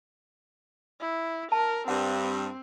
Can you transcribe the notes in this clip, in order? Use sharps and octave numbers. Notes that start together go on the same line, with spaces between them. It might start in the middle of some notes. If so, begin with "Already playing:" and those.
E4
A#4 A5
G2 C4 F#5